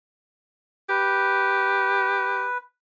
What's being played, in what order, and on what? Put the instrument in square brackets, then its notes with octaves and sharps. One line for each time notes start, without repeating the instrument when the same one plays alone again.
[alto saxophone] G4 [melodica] B4